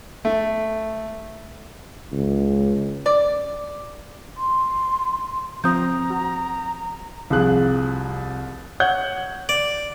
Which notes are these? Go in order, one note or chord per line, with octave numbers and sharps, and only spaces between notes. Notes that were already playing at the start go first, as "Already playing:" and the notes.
A3
C#2
D5
C6
F3 C4 C5 A#5 D#6 G6
F#4
C2 C3 F3 G#4 F#6
C#5 F#5 G6 G#6
D5